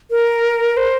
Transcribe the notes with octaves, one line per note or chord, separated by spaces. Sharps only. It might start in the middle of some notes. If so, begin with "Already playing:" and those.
A#4
C5